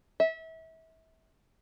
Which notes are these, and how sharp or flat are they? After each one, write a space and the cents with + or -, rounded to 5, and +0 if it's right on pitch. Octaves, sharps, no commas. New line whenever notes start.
E5 -30